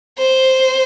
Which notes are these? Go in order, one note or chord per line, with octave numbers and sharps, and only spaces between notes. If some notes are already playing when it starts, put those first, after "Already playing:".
C5